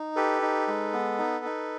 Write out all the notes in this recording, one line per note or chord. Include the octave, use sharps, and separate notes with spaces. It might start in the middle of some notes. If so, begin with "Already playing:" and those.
Already playing: D#4
G4 A4 B4
D#4
G#3
B3
D#4
D#4